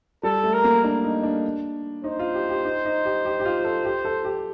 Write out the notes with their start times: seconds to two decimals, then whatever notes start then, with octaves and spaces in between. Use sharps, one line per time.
0.23 G3 A4
0.44 A3
0.53 A#4
0.64 A#3
0.84 D4
1.04 D#4
1.23 D4
2.04 D#4 C5
2.19 F4
2.34 G4
2.49 G4
2.65 D#4
2.85 D#4
3.05 G4
3.25 G4
3.40 G4
3.45 F4
3.64 A4
3.85 G4
4.05 A4
4.25 G4